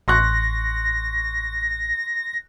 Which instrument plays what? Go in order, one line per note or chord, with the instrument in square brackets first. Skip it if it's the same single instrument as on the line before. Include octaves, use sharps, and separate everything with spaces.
[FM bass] A1 [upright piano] C6 C#6 F#6 [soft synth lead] A#6